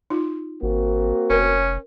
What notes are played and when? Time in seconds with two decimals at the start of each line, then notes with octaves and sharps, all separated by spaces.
0.10 D#4 F4
0.62 G#1 A#3 C4 F#4
1.30 F1 C#4 A#4 B4